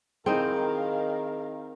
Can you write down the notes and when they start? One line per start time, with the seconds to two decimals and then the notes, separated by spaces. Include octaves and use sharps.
0.26 D#3 C4 D#4 E4 G#4 A#4 F5